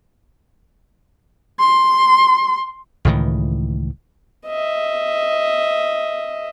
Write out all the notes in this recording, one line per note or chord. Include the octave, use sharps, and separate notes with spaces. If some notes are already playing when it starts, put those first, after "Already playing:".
C6
C#2 A2 D#3 E3
D#5 E5